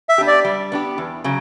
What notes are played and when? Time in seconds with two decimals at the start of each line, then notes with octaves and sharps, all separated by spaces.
0.09 E5
0.18 B3 D4 G4
0.27 D5
0.45 G3
0.72 B3 D4 G4
0.98 E2
1.24 C#3 F#3